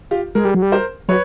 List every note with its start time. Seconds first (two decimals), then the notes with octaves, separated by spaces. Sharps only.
0.11 F4 G4
0.35 G#3 G#4 A#4
0.45 G3
0.54 F#3
0.62 G3
0.72 A#4 C5
1.09 F#3 B4 C#5